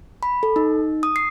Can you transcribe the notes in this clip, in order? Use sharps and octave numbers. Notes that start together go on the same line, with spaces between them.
B5
A4
D#4
D#6
C7